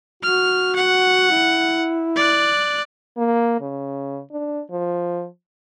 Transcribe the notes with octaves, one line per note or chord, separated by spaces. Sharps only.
F#4 F6
F#5
E4
D5 F#6
A#3
C#3
D4
F3